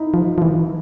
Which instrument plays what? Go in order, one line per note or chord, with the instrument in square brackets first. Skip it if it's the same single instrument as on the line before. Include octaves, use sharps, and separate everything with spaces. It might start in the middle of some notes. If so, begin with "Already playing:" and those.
Already playing: [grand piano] D#4 E4
[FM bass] F3
F3
E3